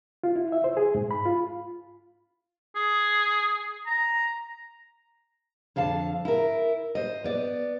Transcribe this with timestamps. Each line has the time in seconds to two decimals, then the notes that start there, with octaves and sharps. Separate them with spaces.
0.23 F4
0.36 E4
0.52 E5
0.64 C5
0.77 G#4
0.95 G#2
1.11 B5
1.26 F4
2.76 G#4
3.87 A#5
5.76 F2 D3 F5 A5
6.25 E4 A#4
6.95 C5 D#5
7.24 B3 D5